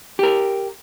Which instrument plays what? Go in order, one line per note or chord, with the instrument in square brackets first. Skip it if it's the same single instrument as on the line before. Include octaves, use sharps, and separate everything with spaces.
[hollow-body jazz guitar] G4 A#4